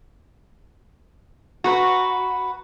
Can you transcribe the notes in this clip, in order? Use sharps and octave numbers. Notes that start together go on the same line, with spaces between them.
F#4 B4 A#5